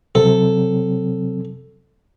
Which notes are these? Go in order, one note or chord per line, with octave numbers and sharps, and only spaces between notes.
C3 F#3 C4 A4